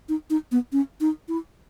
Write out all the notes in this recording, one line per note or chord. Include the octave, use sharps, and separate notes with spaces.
D#4
D#4
B3
C#4
D#4
E4